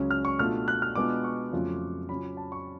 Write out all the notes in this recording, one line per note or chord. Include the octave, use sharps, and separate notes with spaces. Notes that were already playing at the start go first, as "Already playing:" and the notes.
Already playing: C#2 C#3 F#3 C#4
F6
C#6
B2 A3 D4 F4 F6
F#6
F6
B2 G#3 B3 D4 F4 D6
C#6
F2 C#3 F#3 A3 F4
C#3 F#3 C#4 F4 B5
A5
C#6